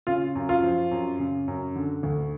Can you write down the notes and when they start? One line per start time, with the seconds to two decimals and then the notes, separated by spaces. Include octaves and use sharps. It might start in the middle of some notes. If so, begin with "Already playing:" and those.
0.07 C#3 F4
0.35 F#2
0.49 F4
0.62 F3
0.91 F#2
1.19 C#3
1.48 F#2
1.76 D3
2.03 D2